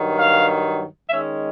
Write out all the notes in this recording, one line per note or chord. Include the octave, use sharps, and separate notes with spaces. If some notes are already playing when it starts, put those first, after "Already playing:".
Already playing: G2 D#3 F#3
F5
D#3 G#3 C#4 E5